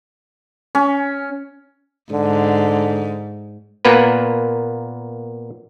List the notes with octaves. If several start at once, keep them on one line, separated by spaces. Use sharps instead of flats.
C#4
G#2 D3
A#2 A#3 B3 B4